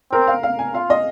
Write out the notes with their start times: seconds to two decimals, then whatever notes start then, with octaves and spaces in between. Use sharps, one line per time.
0.12 C4 A#4
0.27 F5
0.43 F5
0.59 G#5
0.74 F4 F5
0.90 D#5